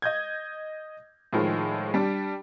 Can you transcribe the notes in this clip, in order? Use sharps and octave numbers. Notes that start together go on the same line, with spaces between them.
D#5 G6 G#6
A2 D#3 F3 G#3
G3 D4